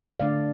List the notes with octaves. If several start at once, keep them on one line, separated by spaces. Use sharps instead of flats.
D3 A3 D4 D5 F5